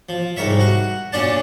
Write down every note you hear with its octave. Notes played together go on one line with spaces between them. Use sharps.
F3
C2 G#2 A#4 C#5 E5
F#4 F#5
F#2 A#2 C#4 D4 D5 A5